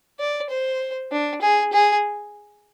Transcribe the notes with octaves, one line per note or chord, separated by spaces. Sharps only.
D5
C5
D4
G#4
G#4